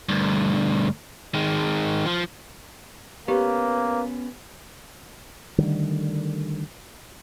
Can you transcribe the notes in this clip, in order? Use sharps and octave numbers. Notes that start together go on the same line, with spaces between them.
D2 G2
D#3 G#3
F3
A#3 B3 C#4 G4 B4
D3 D#3 G3 A3